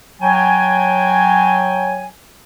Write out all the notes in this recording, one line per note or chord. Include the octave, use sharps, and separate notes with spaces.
F#3 G5 G#5